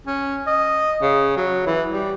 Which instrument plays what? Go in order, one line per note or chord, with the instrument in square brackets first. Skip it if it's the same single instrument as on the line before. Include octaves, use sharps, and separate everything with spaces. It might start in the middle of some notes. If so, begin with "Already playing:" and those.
[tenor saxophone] C#4
D#5
C#3
F#3
E3
G3